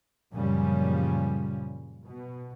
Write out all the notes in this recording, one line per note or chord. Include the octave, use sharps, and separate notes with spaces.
F#2 A#2 C#3 F3 G3 C#4
B2